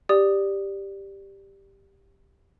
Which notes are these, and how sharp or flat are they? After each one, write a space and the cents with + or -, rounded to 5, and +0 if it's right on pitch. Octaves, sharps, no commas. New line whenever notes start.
G4 +5 D5 +5 D#6 +0